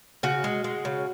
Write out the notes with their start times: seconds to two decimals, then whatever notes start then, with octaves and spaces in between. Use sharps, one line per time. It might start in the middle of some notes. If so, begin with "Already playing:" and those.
0.23 C#3 F#4
0.44 G#3
0.64 G#3
0.85 C#3